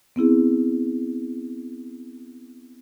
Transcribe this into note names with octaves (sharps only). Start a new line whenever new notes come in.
B3 C4 E4 G#4